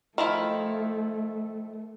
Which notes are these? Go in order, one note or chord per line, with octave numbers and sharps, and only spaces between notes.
D#3 F3 A3 E4